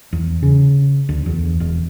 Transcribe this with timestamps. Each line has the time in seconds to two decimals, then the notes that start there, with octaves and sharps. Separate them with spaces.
0.13 E2
0.43 C#3
1.09 D2
1.26 E2
1.60 E1